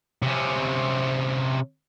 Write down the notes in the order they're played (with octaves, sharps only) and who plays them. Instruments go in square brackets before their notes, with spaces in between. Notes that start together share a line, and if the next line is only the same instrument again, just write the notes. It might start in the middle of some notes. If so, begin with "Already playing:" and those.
[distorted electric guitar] C3 C#4